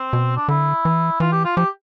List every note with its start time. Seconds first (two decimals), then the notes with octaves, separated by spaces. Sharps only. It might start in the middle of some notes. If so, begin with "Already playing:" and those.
Already playing: C4
0.13 B2
0.37 D4
0.48 D3 E4
0.85 E3
1.20 E3 F4
1.32 G4
1.45 F4
1.56 F3 G4